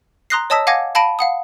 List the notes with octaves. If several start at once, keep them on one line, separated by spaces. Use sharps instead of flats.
A#5 C6 D#6 F#6 A#6 C7
C#5 D#5 A5 D#6 E6 B6
F5 F#5 G#5 D6 G#6 A#6
F5 A5 B5 A#6 D7 D#7
F5 F#5 D#6